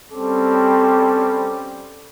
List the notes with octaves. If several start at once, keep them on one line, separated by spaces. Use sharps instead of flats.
G3 C4 C#4 A4 D6